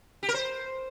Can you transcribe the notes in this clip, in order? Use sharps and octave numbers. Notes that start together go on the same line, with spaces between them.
G4
A#4
C5